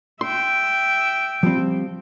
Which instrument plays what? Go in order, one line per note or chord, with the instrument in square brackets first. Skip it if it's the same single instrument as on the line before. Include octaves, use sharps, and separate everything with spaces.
[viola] E5 G5 [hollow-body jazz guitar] C6
[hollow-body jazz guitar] F3 G3 C4